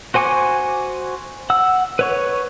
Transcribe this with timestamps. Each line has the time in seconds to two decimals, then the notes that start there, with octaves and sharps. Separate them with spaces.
0.14 F#4 C5 G#5 C#6 D6
1.50 F#5 E6
1.99 B4 C#5 C#6